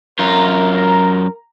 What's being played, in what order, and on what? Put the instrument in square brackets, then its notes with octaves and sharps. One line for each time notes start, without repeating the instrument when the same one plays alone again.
[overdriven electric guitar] F#2 F4 [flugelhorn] A#4 [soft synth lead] A#5